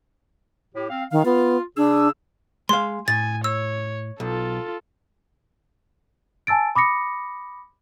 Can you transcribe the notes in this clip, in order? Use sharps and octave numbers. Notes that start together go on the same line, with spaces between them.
A2 G4
C4 F5
D#3 F5
B3 F4
C#3 D4 G#4 E6
G#3 F5 C6
A2 G#5 A6
C#5 E6
B1 F4 A4
G#5 A5 E6 A6 D7
B5 D6 D#6 A#6 C#7